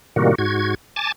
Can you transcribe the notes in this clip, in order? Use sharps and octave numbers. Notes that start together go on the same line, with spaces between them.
A2 C3 D#3 G3 A#3 F#4
G#2 F#4 G#6
G#5 A5 D6 A6